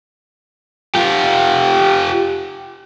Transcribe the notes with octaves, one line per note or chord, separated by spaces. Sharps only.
F4 G4